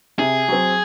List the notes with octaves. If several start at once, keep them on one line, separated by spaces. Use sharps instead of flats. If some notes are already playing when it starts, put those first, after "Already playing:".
C3 G#4
F#3 C4